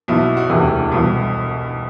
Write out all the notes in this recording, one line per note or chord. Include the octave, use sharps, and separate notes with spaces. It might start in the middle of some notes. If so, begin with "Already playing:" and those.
B1 B2 E4
F#4
F#4
E1 D2 C3 E3
C2 B2